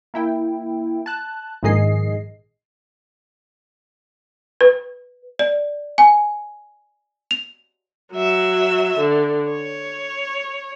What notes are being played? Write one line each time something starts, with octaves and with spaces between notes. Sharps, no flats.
A#3 E4 G5
A5 F#6
A#1 G#2 D#3 G#4 D#5 C7
B4
D5
G#5
F7
F#3 E5
D3
C#5